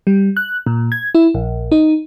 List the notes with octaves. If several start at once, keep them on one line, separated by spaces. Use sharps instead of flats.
G3
F#6
A#2
G#6
E4
A#1
D#4